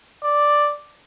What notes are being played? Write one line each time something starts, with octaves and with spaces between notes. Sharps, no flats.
D5